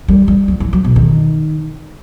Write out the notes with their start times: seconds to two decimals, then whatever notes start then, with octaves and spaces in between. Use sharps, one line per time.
0.08 G3
0.28 G3
0.48 F#3
0.60 E3
0.73 F#3
0.84 B2
0.96 D#3